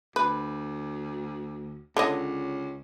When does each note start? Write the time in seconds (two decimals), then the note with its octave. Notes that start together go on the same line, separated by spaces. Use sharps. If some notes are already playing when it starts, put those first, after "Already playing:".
0.16 D2 B4
1.97 C#2 D3 C#5 D#5